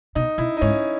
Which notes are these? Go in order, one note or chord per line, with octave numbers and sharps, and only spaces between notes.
B2 D#4
B2 E4
D#4
G#2 C#4